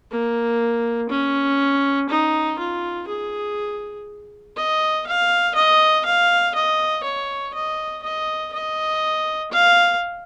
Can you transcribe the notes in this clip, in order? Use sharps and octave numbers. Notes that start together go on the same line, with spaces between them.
A#3
C#4
D#4
F4
G#4
D#5
F5
D#5
F5
D#5
C#5
D#5
D#5
D#5
F5